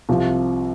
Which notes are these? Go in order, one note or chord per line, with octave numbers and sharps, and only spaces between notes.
C2 C3 F3